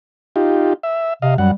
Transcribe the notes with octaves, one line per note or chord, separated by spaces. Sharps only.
D#4 F4 G4
E5
C3 D#5 F5
F#2 G3 F#5